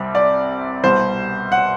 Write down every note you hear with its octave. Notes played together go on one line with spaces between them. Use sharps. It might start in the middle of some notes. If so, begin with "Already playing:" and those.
Already playing: C2 C3 G3 C4
D5
C2 B2 G3 C5
F#5